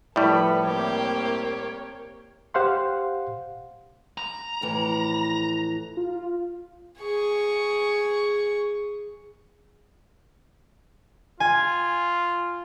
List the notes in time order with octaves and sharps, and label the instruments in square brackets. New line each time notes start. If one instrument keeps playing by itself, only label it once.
[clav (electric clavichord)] A2 G3 [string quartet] F3 A4 B4 [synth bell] E4 D5 E5
[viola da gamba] A#3 C4 G4 [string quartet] A#4 C#5
[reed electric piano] G4 C5 F5 F#5 C6
[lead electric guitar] A#5
[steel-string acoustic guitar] F2 A2 E3
[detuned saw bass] F4
[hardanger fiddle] G#4 C#6
[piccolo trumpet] F4 [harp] G#5